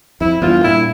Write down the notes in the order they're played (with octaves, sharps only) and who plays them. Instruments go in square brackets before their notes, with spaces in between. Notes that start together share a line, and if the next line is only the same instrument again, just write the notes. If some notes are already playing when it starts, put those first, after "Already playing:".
[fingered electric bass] F2 [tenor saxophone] E4
[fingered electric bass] E2 G2 [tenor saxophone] F4
[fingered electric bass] G2 A#2 [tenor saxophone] E4